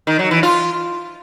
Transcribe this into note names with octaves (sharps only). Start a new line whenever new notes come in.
D#3
F#3
E3
F4